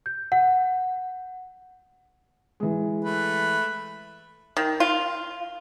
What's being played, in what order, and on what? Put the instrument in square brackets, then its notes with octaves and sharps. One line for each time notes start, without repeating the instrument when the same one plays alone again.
[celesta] G6
F#5
[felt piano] E3 G#3
[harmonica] A3 B4
[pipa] D#3
F4